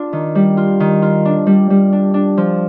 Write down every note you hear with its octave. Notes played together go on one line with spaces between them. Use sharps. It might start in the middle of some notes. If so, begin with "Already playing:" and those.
Already playing: D4 F4
D#3
G3
F4
D#3
F4
D4
G3
G3
D4
D4
F3